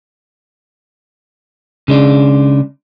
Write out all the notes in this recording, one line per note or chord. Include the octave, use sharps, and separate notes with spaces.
C#3 G#3 D4